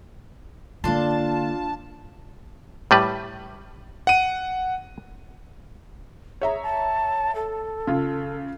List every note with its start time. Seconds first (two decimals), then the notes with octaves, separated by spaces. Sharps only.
0.84 D3 A#3 D4 F4 A5 C6
2.91 A2 G3 B4
4.07 F#5 D#7
6.41 G#4 C#5 E5 A#5
6.63 A5
7.35 A4
7.87 C#3 F4